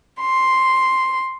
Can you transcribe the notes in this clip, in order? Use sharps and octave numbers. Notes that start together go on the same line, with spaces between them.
C6